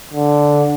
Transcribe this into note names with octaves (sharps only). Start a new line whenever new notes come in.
D3